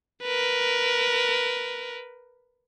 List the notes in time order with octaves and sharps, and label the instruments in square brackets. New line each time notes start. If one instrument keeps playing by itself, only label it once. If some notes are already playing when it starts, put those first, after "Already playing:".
[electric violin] A#4 B4